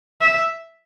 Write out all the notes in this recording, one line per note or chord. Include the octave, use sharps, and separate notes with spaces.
E5